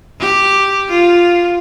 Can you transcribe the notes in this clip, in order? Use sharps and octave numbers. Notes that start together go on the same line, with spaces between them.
G4
F4